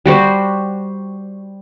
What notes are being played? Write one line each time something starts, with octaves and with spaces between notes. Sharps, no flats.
G3 F#4 C5